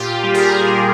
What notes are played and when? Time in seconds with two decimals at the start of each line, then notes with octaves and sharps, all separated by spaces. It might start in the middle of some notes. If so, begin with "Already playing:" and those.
Already playing: A#2 F4 G4
0.24 G3
0.34 G#4 A#4
0.54 G3